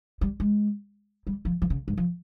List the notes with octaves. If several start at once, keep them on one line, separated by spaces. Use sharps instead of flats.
G3
G#3
G3
F3
F3
C#3
G#2
F3